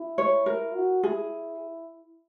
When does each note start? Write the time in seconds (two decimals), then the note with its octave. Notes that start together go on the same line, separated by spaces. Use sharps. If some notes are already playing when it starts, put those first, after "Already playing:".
Already playing: E4
0.18 C#5
0.46 A#4
0.75 F#4
1.03 E4 G#4